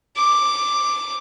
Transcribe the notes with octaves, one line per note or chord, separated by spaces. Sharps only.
D6